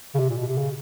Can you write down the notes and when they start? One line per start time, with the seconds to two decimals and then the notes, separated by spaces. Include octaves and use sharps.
0.15 C#3
0.19 C3
0.29 A#2
0.38 B2
0.48 C3
0.58 C#3